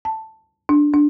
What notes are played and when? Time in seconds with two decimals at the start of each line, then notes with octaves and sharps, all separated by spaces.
0.05 A5
0.69 D4
0.93 D4